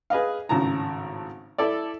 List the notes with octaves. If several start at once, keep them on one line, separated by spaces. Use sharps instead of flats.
G#4 B4 D#5 F5
G#1 A2 C#3 A5 A#5
E4 A4 D5